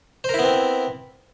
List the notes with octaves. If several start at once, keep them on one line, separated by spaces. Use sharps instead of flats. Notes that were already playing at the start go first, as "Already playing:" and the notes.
B3 C4 E4 A#4 C5